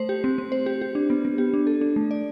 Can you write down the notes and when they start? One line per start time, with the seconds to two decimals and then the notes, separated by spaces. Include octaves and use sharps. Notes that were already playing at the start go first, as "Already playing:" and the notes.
Already playing: A3 C5
0.09 G4
0.24 C4
0.38 C4
0.52 C5
0.66 G4
0.82 G4
0.95 D4
1.10 B3
1.25 B3
1.38 G4
1.54 D4
1.67 A4
1.81 D4
1.96 A3
2.11 D5